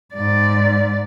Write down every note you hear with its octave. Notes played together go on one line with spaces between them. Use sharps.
G#2 D5